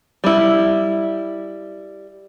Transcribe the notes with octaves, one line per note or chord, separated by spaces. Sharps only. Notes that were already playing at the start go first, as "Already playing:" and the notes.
G3 E4